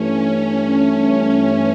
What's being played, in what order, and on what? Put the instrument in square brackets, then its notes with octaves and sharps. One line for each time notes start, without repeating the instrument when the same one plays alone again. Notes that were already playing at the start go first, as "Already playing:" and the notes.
Already playing: [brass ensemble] G2 E3 A3 [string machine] C#4